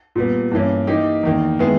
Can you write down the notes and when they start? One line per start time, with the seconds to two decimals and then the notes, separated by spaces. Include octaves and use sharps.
0.15 A#2 G3 B3
0.52 G2 E3 A#3 C#4
0.87 E3 A#3 D#4 G4
1.23 E2 D#3 A#3
1.59 D#3 G#3 B3 E4 G#4